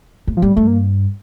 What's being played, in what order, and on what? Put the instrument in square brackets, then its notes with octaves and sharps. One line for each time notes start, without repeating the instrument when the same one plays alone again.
[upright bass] A2
[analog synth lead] F3
[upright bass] A2 [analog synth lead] G3
[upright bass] G2 [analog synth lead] A3
[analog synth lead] A#3